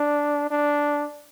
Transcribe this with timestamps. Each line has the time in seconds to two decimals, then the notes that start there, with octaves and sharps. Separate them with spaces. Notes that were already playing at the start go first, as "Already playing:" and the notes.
Already playing: D4
0.51 D4